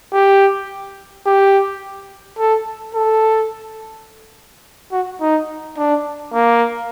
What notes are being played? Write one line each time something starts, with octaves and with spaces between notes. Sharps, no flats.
G4
G4
A4
A4
F#4
D#4
D4
A#3